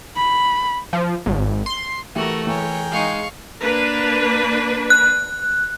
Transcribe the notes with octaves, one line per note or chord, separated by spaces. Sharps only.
B5
F3
G#1
C6
E3 A3 F#4 G4 A#4 E5
E3 G#4 A#4 C#5 G5
G#3 D#4 F5 C#6
A#3 D4 B4
F#6